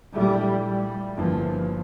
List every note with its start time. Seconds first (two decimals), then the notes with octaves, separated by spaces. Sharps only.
0.15 A#1 A#2 G3 A3 E4 G4
0.66 G3
1.17 G1 G2 E3 F3 A#3